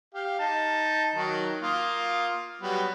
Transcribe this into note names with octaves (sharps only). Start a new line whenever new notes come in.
G4 F5
D#4 A5
D#3 F#3
A#3 F4 D#6
F#3 G3 B3